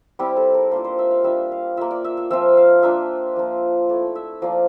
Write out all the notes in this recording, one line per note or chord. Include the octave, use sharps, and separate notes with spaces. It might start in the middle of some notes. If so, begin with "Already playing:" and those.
G3 C4 E4 G4
A4
A#4
A#3 D4 F4 C5
C5
E5
F5
G3 D4 F4 E5
F5
A#3 F4 E5
D5
E5
E5
F3 C4 F4 E5
F5
A#3 D4 F4 E5
F3 A#3 F4
A3 E4 D5
E5
F3 A#3 F4 D5